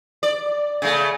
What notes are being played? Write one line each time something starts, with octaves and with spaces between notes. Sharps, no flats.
D5
C#3 A3